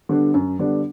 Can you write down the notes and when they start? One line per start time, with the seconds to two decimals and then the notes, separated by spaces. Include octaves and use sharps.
0.09 D3 G3 B3 D4
0.34 F#2
0.59 D3 G3 B3 D4